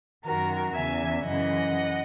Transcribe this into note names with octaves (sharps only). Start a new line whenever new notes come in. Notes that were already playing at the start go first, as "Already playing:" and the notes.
F#2 D#3 F#4 A#4
E2 C#3 E3 E5 G#5
F#2 C#3 E3 D#5 F#5